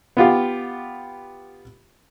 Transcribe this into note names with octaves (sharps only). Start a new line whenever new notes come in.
B3 F4 G4